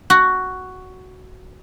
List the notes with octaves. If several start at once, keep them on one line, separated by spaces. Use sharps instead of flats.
F#4